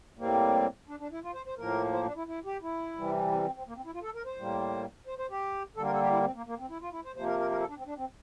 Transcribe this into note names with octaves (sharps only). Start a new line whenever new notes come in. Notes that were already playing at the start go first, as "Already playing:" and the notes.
A2 G3 A#3 C4
D4
D4
E4
F4
C5
C5
A2 F3 A#3 A#4
C5
D4
E4
E4
G4
E4
C3 E3 G3
C4
C4
C4
A#3
C4
E4
F4
A4
A#4
C5
A2 G3 A#3
C5
C5
G4
D3 G3 A#3 A4
A#4
A4
G4
E4
C4
A#3
A#3
C4
E4
F4
E4
C5
C3 F3 A#3 C5
A#4
A#4
A#4
A4
D4
C4
D4
C4